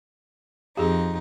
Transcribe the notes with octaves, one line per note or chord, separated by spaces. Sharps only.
F2 D#4 G4 G#4